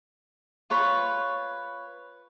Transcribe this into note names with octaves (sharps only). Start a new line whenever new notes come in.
F4 B4 C#5 B5